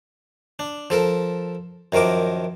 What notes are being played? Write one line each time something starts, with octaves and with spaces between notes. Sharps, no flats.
D4
F3 A4 A#4
F#2 D#3 F3 A#4 D6